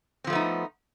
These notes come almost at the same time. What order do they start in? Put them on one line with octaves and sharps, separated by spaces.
C4 F3 A3 B3 D#4